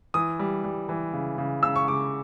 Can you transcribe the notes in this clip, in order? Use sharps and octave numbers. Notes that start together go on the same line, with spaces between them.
E3 D#6
G3
G3
E3
C#3
C#3
C#3 E6
C#6
C#3 D6